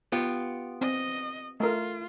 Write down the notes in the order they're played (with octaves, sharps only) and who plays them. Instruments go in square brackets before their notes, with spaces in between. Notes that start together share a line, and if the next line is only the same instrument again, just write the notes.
[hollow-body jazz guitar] B3 F4 G4
[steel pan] C4 [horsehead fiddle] D#5
[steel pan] A3 A#4 [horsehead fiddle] F4